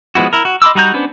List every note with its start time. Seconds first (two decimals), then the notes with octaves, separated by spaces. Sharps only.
0.15 F3 G#3 B3 E4 F#4
0.33 E4 A#4
0.45 F#4
0.62 D#5 B5 C6 D6 E6
0.75 G3 D#4 F#4 A#5 G6
0.94 B3 C#4 D4 B4 C5